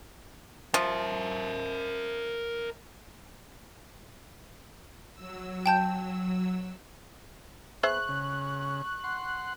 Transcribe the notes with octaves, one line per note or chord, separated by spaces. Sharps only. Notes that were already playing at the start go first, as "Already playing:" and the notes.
F3 A#4 E5
F#3 E6
G5 A5 G6
B3 G#4 C5 E5 C#6 F#6
C#3
F#5 C6